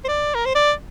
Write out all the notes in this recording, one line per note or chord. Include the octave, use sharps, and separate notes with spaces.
C5
D5
A#4
C5
D5